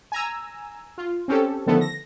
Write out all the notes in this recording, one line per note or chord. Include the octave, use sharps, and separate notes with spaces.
G#5 A#5 E6
F4
C4 C#4 G4 A4
D3 D#3 F3 A3 B3 A4
A#6